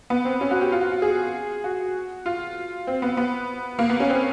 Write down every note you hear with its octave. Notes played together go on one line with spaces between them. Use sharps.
B3
C4
C#4
F#4
G4
F4
F#4
F#4
G#4
F#4
F4
C4
B3
B3
A#3
B3
C#4
C4